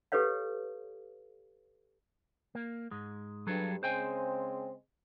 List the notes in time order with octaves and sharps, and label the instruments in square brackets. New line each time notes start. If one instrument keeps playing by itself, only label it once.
[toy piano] G4 A4 B4 C#5 F5
[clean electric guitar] A#3
G#2 G#3
[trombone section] G2 [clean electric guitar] F#3 G#4 A4
[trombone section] C#3 G#3 C4 [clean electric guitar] C5 G5 G#5